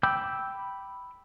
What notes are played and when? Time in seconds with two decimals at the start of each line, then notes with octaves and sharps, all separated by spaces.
0.03 G5 B5 D6 E6 G6